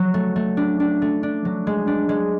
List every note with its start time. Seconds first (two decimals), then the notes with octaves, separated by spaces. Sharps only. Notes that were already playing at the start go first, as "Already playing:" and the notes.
Already playing: F#3
0.14 A3
0.36 A3
0.57 D4
0.80 D4
1.02 A3
1.23 D4
1.45 F#3
1.67 G#3
1.87 D4
2.09 G#3